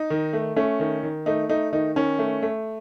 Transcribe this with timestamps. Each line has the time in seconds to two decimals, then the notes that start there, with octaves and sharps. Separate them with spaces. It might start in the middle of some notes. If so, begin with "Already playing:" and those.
Already playing: D#4
0.10 D#3
0.33 A3
0.56 A3 C#4
0.80 D#3
1.03 D#3
1.26 A3 D#4
1.49 A3 D#4
1.73 D#3 D#4
1.96 D#3 C#4
2.19 A3
2.42 A3